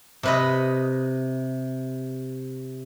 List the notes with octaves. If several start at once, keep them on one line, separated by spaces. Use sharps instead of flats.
C3 B4 D#5